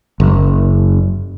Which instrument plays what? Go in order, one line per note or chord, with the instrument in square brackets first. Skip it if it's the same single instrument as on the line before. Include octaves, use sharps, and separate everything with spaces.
[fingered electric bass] F#1